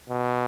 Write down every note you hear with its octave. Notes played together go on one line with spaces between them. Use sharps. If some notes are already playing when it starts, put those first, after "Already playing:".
B2